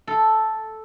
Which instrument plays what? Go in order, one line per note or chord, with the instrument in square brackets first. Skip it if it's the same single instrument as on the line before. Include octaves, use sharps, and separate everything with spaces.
[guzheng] A4